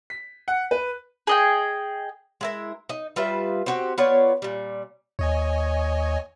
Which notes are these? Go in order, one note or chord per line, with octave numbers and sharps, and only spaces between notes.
B6
F#5
B4
G#4 D#5 G5
G#3 E4 A#4
D#4
G3 F4 B4 E5
C4 F#4 G4
B3 F4 C#5 D5
A#2 G3
D#2 C#5 D#5 G#5